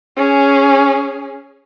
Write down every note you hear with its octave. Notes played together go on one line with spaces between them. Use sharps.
C#4 G#4